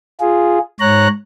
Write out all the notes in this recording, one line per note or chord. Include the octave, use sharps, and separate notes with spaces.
F4 G#4
G#2 C#5 A#5 F#6